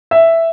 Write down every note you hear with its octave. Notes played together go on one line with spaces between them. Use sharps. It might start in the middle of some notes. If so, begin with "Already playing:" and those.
E5